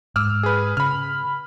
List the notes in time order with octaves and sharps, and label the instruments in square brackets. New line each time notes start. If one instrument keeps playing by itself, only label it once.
[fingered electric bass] G#2 [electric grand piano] D6 E6 F6
[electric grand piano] G#4 B4
[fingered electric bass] C#3 [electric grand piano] B5 F6